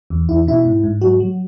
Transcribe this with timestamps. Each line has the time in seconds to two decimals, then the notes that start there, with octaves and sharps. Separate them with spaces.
0.10 E2
0.29 E2 E4
0.47 B2 E4
0.65 G#2
0.83 G#2
1.01 F#3 F#4
1.20 F#3